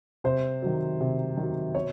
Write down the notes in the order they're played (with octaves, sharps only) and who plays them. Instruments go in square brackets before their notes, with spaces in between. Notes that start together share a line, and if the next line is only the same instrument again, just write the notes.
[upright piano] C3 C5
D#3 F#3
C3
D#3 F#3
B2 C#5